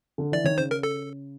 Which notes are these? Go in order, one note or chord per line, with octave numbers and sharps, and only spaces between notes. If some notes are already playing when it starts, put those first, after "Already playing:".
D3
E3 D5
D#3 C#5
C#3 C5
A#4
A4